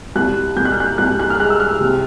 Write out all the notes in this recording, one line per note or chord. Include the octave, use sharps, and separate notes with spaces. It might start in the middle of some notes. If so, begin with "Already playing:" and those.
C2 F#6
C2 G6
F#6
F6
F#6
C2 F#6
F#6
F6
G#3 F#6
E6
F6
C3